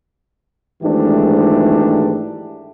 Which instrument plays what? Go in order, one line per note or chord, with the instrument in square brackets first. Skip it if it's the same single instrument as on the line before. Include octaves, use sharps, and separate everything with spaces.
[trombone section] G#1 G#2 E3 A3 D4 G4